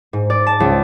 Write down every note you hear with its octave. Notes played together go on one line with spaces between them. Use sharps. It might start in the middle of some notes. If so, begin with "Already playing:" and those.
G#2
D5
A5
C#2